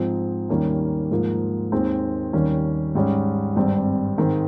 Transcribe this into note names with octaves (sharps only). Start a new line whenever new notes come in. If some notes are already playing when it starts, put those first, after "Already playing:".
Already playing: G#2 F3 C4 D#4
D#2 D#3 G3 A#3 C#4
G#2 F3 A#3
D#2 D#3 G#3 C4
D#2 D#3 G3 C#4
G#2 G3 C#4
G#1 G2 G3 C4
G#2 D#3 G#3 C4